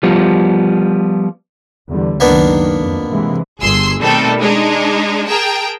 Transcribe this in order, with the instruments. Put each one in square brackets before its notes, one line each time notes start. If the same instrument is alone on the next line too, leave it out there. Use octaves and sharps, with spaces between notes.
[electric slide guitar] F3 G3 B3
[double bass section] E2 D3 G3
[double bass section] C#2 F#2 D#3 [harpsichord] A#3 B3 D4
[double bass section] F2
C3 E3 G#3
[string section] G1 G#4 C6 E6 C7
B2 D#3 G3 A3 C4 A4
G#3 D4 D#4
G#4 A#4 G5 A5